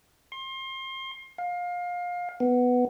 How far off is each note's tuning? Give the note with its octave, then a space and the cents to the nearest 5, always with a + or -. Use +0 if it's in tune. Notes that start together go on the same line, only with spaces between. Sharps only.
C6 +30
F5 +25
B3 +5